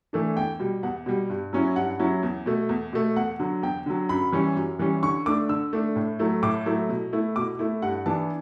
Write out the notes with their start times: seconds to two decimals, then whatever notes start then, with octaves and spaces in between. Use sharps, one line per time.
0.13 E3 A3 D4
0.36 E2 G5
0.60 B2 G3
0.83 E2 F#5
1.06 B2 G3
1.29 G2
1.53 F#3 C#4 E4
1.76 G2 F#5
1.99 F#3 C#4 E4
2.23 E2
2.46 B2 A3
2.69 E2
2.93 B2 A3
3.16 E2 F#5
3.39 D3 F#3
3.62 E2 G5
3.86 D3 F#3
4.09 F#2 B5
4.32 E3 G3 C#4
4.56 F#2
4.79 E3 G3 C#4
5.03 D3 C#6
5.26 A3 D4 D6
5.49 D3 E6
5.73 A3 D4
5.96 A2
6.19 F#3 A3 E4
6.43 A2 D6
6.66 F#3 A3 E4
6.89 B2
7.13 A3 E4
7.36 B2 D6
7.59 A3 E4
7.82 G2 F#5
8.06 E3 B3 D4 A5